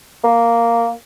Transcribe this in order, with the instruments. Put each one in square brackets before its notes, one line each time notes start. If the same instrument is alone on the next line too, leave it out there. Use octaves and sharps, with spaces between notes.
[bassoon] A#3